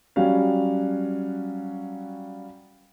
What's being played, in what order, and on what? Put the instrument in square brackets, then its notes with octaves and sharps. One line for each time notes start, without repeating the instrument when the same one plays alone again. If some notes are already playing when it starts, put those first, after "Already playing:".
[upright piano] F#3 G3 C#4 F#4 F5